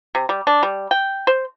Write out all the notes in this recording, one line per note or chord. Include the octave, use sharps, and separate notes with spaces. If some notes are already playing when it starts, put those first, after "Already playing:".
C3
G3
D4
G3
G5
C5